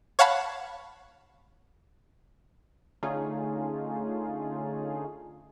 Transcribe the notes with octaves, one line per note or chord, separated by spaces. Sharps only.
C#5 F5 F#5 A5 B5
D3 A3 C#4 D#4 F4 G#4